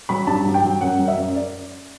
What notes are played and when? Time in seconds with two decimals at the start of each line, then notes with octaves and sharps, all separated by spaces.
0.09 F#3 B5
0.27 G2 A5
0.45 F#3
0.54 G5
0.64 F#3
0.81 F#2 F#5
0.99 F#3
1.08 E5
1.17 F#2
1.35 D5